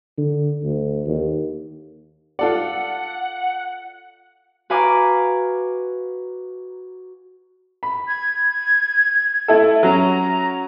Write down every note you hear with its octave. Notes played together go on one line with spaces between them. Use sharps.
D3
D2
D#2
F4 A4 D5 F#5
F#4 B4 F5 G#5 A#5 D6
B5
G#6
A3 E4 A4
F#3 C#4 A#5